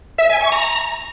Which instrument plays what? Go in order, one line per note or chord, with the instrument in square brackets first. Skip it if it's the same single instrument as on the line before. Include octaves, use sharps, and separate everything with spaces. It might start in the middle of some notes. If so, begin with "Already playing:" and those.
[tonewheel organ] E5
G#5
C#6
A#5